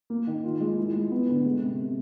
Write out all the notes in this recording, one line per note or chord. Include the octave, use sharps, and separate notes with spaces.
A#3
D#3
F4
G#3
E4
G#3
B3
D3
G#3
C3